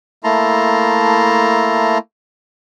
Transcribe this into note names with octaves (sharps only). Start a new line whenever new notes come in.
A3 A#3 E4 A5 A#5 C6